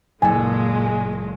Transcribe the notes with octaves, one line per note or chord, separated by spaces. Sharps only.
F#1 A#2 G#3 A4 G#5